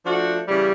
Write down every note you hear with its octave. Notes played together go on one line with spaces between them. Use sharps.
F3 A3 D4 F#4
C#3 E3 G3